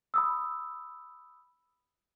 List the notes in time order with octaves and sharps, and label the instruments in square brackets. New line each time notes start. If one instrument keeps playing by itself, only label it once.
[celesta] B5 D#6 E6